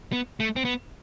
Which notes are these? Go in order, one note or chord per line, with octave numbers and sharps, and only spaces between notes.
B3
A3
C4
B3